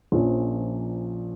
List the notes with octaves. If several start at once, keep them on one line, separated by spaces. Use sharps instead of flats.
A#1 A#2 F3 C#4